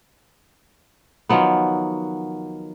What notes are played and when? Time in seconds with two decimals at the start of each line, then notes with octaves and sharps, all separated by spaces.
1.29 D#3 F3 F#3 B3